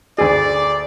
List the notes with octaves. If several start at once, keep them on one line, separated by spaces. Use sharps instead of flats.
D2 G#4 D5